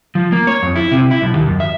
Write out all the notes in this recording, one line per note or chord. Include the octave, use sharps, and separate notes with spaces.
F3
A#3
C#5
F2
E4
C3
E4
B1
D#2
F#2
E5